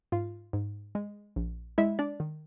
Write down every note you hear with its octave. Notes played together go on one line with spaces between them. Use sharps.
G#2 F4 F5
G#2
G#3
A#1
G#3 E4 E5
D4 D5
D#3